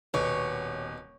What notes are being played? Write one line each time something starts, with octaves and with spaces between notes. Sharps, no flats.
D#1 B2 C#5